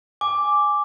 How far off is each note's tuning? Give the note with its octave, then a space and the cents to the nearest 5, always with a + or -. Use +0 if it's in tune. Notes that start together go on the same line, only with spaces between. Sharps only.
G#5 +0 D6 +0